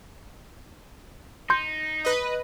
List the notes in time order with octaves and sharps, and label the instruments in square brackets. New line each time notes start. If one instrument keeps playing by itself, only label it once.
[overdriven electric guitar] D#4 [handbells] C6 G6
[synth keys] B4 D#5